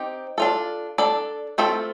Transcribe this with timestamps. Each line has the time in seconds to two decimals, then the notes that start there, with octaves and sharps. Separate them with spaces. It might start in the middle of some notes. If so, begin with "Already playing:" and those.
Already playing: C4 D#4 G4
0.38 D4 F4 A4
0.98 D4 A4 D5
1.58 A3 C4 F4 A4